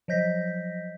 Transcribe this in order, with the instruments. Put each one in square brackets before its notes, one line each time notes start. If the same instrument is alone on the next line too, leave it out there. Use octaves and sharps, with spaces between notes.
[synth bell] F3 F#3 D#5 G6 A#6 B6